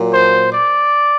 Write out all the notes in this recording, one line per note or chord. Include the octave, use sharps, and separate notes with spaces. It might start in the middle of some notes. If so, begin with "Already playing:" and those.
Already playing: A#2 F#3
C5
D5